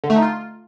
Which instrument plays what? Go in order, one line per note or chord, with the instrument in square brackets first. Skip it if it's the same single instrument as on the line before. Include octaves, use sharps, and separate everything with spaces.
[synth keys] D3
A3
D#4
F4